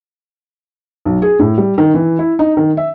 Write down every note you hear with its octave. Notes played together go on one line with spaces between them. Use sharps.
B1
G#4
A2
G3
D#3
E3
E4
D#4
D#3
E5